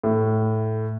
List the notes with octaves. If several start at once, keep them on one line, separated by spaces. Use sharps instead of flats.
A2